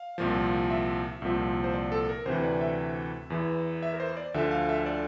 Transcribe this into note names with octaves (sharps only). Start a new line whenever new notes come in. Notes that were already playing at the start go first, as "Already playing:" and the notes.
Already playing: F5
C2 A#2 F3
E5
C2 A#2 F3
C5
D5
A4
A#4
D2 C3 E3 C5
D5
E5
E2 E3
E5
A#4
C5
D5
D2 D3 F3 E5
F5
E5
D5